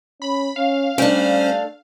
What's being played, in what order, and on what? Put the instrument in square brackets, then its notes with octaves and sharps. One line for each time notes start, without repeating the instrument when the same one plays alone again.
[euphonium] C#4 [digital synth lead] B5
[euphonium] C#4 [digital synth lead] F5
[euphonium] G3 [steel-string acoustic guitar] A3 D4 [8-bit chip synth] C#4 C5